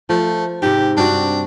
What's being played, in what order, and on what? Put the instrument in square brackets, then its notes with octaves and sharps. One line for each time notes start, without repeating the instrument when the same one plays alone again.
[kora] F3 [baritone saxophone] A3
[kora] G#2 C3 [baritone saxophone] G4
[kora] G2 C4 F#4 [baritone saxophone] D4